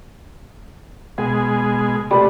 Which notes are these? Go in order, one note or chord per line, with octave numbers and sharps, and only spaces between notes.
B2 G#3 G#4 G#5
C3 G3 A3 B4